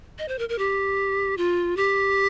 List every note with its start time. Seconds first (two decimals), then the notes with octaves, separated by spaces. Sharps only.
0.19 D#5
0.28 C5
0.39 A#4
0.49 A#4
0.58 G4
1.37 F4
1.77 G4